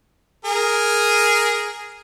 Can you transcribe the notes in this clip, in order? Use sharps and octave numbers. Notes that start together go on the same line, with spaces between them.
G#4 A#4